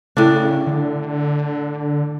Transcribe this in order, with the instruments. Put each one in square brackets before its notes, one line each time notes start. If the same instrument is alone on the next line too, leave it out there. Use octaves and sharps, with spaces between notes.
[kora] A2 D4 [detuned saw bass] C#3
[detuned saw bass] D3